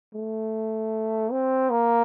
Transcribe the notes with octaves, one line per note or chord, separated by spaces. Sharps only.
A3
C4
A#3